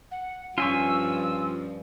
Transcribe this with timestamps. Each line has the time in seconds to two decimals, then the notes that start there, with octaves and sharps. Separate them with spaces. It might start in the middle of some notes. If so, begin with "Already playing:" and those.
0.11 F#5
0.58 G2 F3 C#4 F4 G#5 C#6 E6